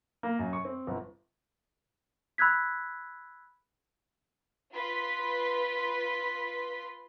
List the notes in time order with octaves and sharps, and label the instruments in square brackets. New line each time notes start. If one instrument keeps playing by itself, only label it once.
[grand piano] A#3
F#2
C#6
C4
G1
[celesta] B5 E6 F#6 G#6 B6
[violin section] F4 B4 C6 B6